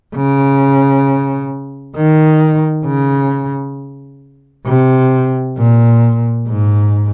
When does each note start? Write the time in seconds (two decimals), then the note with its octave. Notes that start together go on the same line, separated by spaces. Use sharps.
0.15 C#3
1.96 D#3
2.86 C#3
4.66 C3
5.57 A#2
6.47 G#2